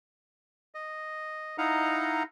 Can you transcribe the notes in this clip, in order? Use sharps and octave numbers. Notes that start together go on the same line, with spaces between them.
D#5
D#4 E4 D#5 F5 F#5 A#5